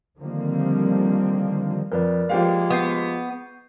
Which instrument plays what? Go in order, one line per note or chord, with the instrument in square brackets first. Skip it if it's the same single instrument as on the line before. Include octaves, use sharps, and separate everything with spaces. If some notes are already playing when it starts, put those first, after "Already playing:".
[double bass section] D3 D#3 F3 G3 A#3 C4
[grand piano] F2 [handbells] A#4 B4 D5
[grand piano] F3 G4 F5 [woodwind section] G#3 A#3
[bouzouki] B3 [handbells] C#6 G6 C7